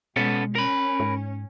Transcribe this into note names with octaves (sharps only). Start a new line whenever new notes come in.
B2 G#3 B3 C#4 A4
C#4 A#4 B5
G#2